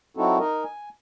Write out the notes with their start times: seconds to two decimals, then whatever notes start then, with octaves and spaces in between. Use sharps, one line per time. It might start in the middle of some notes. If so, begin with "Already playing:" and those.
0.17 F#3 C4 D#4 E4 F#4 A4
0.39 D#4 A#4 D#5
0.64 G#5